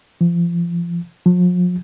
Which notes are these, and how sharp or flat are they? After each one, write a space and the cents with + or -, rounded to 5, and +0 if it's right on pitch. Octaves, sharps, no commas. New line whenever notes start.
F3 -30
F3 +40